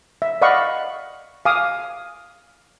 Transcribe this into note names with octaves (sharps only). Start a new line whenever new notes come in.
E5
D5 D#5 F5 F#5 B5 C#6
F5 G#5 D6 D#6